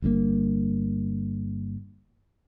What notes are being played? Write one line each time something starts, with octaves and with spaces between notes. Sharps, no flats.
G1 G2 C#3 A#3